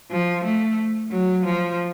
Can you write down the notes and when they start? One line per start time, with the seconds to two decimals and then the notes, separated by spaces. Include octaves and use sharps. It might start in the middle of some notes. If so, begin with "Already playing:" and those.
0.11 F3
0.45 A3
1.11 F#3
1.45 F3